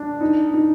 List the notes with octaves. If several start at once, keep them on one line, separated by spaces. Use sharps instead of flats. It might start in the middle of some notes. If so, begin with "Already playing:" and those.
Already playing: D4
D#4
D#4